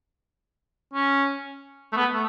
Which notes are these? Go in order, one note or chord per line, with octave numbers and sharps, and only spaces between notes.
C#4
A3
B3
A3